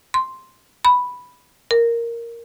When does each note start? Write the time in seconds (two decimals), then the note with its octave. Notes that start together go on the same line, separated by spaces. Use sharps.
0.14 C6
0.85 B5
1.71 A#4